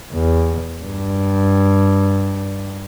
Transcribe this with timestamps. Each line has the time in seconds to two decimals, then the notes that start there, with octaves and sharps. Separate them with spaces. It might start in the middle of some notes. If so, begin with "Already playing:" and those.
0.13 E2
0.84 G2